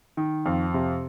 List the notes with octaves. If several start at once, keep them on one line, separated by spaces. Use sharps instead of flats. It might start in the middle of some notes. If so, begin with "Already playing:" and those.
D#3
F2
C3